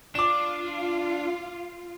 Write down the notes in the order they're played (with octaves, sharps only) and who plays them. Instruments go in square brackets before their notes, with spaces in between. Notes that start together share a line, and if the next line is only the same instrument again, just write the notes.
[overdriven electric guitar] D4 [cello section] F4 [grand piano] D6 E7